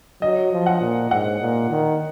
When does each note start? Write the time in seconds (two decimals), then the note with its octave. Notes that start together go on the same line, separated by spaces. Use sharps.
0.22 F#3 D#5
0.52 F3
0.66 F#5
0.81 A#2
1.11 G#2 F#5
1.41 A#2
1.71 D#3